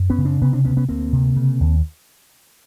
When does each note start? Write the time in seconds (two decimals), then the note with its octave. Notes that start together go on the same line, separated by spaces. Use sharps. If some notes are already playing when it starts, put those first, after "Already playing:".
Already playing: F#2
0.10 B3 C#4
0.18 C#3
0.25 C4 D4
0.41 C3 B3 C#4
0.53 C4 D4
0.65 D2 B3 C#4
0.77 B3 C#4
0.89 D2 A#3 C4
1.13 C3
1.36 C#3
1.60 D#2